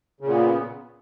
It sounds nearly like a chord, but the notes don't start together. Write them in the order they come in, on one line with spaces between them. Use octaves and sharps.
C#3 A#2 B3